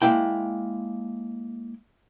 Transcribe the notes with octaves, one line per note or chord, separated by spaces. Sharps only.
G#3 A#3 E4 G5